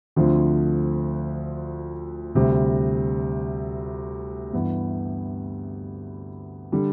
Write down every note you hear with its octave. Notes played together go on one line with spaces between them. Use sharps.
D2 D3 F3 C4 F4
D2 C3 G3
G2 E3 B3
D3 G3